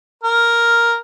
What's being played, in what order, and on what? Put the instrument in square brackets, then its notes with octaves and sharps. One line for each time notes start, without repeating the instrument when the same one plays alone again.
[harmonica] A#4